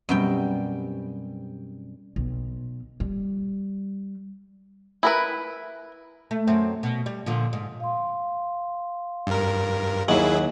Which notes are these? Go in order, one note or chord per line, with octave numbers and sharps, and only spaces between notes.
F#2 B2 G3 C4 G5
B1
G3
E4 A#4 B4
A3
F#2 C4
B2
G3
A#2 D3 F3
G#2
F5 C6
G2 A#4
D#2 F#3 E4 G#4